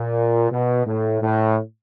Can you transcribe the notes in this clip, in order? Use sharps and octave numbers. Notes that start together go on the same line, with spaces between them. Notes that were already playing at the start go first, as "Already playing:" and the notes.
Already playing: A#2
B2
A2
A2